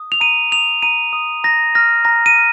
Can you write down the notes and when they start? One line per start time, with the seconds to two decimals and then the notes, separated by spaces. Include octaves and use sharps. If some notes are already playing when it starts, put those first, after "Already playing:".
Already playing: D#6
0.12 F7
0.21 A#5 D#7
0.51 D#6 F7
0.82 A#5 D#7
1.13 D#6
1.44 A#5 A#6
1.75 F6 A#6
2.05 A#5 A#6
2.26 D#7
2.36 F6